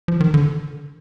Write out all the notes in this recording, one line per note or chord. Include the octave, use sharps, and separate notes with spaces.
F3
D#3
D3